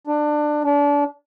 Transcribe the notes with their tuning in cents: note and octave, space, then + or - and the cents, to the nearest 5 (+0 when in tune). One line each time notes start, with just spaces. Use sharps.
D4 +20
D4 -30